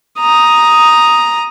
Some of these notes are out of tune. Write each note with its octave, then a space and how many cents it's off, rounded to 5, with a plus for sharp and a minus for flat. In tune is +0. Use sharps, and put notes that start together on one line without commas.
A#5 +5 D#6 +0